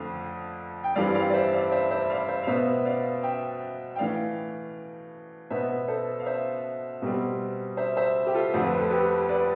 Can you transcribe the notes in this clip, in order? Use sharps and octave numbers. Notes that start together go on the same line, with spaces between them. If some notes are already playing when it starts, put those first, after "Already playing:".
Already playing: F2 D3 A3 C4 F5
G5
G2 E3 G3 C4 D5 F5
D5 F5
D5
C5 E5
D5 F5
C5 E5
C5 E5
D5 F5
C5 E5
F5
B2 B3 C5 E5
D5 F5
E5 G5
G5
A2 E3 A3 D5 F5
B2 B3 C5 E5
A4 C5
F5
C5 E5
B2 G3 C4
C5 E5
C5 E5
G4
F4 A4
F2 D3 A3 C4 C5
B4
A4
G4 B4
B4 D5